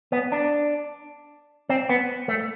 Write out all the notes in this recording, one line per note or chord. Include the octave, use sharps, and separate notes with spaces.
B3
D4
C4
B3
A3